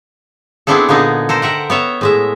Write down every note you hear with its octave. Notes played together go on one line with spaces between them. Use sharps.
B3 C4 D4 E4 G#4 A4
A#2 D3 B3 D#4 G#4
A4 A#4 C5
A#4 E5 F#5 G5
B3 C#5 E5
A2 G#3 E5